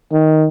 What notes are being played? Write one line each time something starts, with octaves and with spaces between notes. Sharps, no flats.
D#3